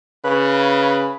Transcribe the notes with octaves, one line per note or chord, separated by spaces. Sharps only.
C#3 B4